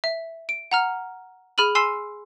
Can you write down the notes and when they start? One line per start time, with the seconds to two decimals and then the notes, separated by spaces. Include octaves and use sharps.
0.04 E5
0.49 D7
0.71 F#5 A#5 F6
1.58 G#4 B5 F6 D#7 F#7
1.75 G#5 C6 E6 C7 E7